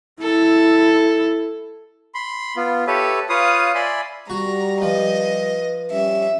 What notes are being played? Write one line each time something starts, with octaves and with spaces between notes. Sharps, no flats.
E4 A4
B5 C6
B3 F4
G4 A4 B4 C#5 E5
F4 B4 C#5 F5 D#6
D5 E5 G#5 B5 C6
G3 F#4 A#5
F3 B4 D#5
G3 C#4 G4 E5